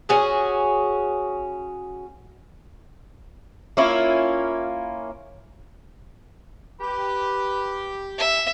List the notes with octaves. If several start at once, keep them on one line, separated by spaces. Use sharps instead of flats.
C#4 F#4 G#4
A#3 C#4 E4 F4
G4 B4
E5